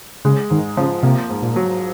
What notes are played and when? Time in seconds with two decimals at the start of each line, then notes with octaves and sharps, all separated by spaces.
0.25 C#3 G#3
0.50 G#2 D#3
0.77 C#3 F3
1.03 C3 A#3
1.30 G#2
1.42 A#2
1.56 F#3